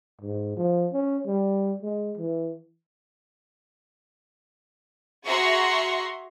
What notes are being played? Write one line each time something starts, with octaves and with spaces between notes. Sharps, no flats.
G#2
F3
C#4
G3
G#3
E3
F#4 G#4 E5 A#5 C6 C#6